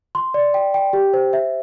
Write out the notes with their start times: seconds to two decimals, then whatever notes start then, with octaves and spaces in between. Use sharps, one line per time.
0.15 C6
0.34 D5
0.54 G5
0.74 G5
0.93 G4
1.14 C5
1.33 E5